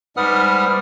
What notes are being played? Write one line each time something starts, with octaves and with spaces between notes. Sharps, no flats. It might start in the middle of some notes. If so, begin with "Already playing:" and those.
G#2 G3 B4 F#5 D#6 F6